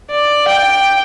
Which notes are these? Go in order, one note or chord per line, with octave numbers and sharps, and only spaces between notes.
D5
G5